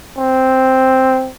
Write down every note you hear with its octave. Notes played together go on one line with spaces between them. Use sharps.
C4